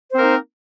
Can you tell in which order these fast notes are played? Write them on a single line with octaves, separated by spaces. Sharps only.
C5 C4 A#4 A#3 D#4